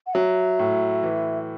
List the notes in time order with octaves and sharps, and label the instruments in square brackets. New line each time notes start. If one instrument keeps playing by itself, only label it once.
[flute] F#5
[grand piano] F#3 [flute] E5
[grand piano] A2
E3